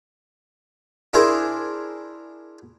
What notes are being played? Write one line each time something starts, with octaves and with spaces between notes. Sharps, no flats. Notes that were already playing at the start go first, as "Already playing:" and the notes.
D4 E4 G#4 A#4 C5